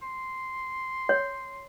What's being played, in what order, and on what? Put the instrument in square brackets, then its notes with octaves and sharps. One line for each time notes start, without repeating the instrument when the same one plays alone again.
[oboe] C6
[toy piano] C#5